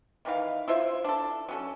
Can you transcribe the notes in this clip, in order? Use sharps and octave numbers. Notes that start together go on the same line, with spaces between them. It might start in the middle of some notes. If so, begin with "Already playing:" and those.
D#3 E3 F#4 F5
E4 F4 C5 E5
D4 A4
F#3 C#4 A4